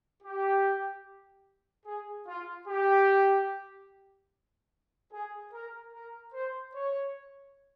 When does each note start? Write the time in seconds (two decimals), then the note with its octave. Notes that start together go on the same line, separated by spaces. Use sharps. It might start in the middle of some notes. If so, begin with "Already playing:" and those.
0.23 G4
1.86 G#4
2.26 F4
2.67 G4
5.12 G#4
5.53 A#4
5.94 A#4
6.33 C5
6.74 C#5